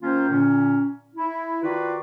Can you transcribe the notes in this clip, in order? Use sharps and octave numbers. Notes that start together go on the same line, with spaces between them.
D#3 A#3 C#4 F4 C5
A#2 D3 C#4
E4
D#3 F4 F#4 B4 D5